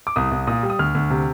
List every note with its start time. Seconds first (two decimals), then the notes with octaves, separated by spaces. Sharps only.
0.07 D6
0.16 C2 D#6
0.31 C2
0.47 A#2 D#6
0.63 G3
0.70 D#6
0.79 D2 F6
0.95 D2
1.10 C3